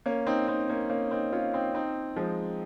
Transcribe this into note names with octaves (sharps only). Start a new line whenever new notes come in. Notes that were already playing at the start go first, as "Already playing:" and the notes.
A#3 C#4
C4 D#4
C4 D#4
A#3 C#4
A#3 C#4
C4 D#4
C#4 F4
C4 D#4
C4 D#4
F3 G#3